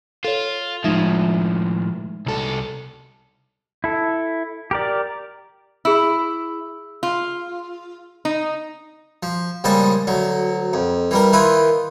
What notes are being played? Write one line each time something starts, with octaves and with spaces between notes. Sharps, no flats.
F4 A4 C#5
A2 F3 G#3 D#4 E5
C2 A4
E4 A4
G4 A#4 D5
E4 G#4 E6
F4
D#4
F3
A#1 C#3 G3 G#3 A5
D2 F#3
F2
E3 G3 A#4
D#3 E4 F4 B4